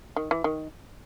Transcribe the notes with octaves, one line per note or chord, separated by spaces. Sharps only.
D#3
E3
D#3